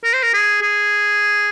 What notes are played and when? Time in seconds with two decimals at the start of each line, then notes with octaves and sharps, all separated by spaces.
0.04 A#4
0.14 C5
0.23 A#4
0.34 G#4
0.62 G#4